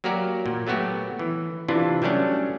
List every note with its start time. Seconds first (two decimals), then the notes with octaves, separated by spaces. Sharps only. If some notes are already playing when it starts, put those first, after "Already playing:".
0.04 F#3 A#3 F#4 G4 A#4 D5
0.46 A#2
0.67 F#3 A3 B3 F#4 G4
1.19 E3
1.68 C3 E3 D4 E4 F4
2.02 F#3 G3 A3 C#4 D4